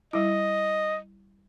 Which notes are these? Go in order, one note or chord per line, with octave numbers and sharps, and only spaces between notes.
G3 E4 D#5